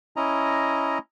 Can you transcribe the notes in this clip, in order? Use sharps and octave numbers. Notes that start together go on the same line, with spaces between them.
C#4 E4 D#5 A#5